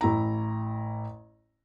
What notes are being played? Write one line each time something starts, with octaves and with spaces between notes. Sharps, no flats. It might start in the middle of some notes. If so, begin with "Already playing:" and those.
A1 E4 A#5